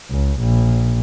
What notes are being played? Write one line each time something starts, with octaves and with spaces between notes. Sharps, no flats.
C#2
A#1